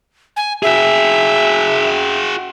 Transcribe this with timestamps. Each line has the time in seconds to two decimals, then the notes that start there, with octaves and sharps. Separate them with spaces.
0.36 G#5
0.63 F#4 G#4 E5